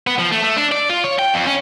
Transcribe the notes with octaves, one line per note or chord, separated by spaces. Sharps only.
B3
F3
A3
A3
D4
D5
F4
C#5
G5
F2
C#4